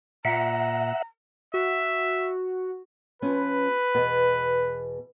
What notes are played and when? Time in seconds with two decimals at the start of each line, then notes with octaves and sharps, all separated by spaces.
0.25 A#2 E5 F#5 A#5
1.54 F#4 E5
3.22 F3 B3 C#4 B4
3.94 E2 B2 B3